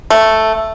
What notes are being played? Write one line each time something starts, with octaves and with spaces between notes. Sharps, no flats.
A3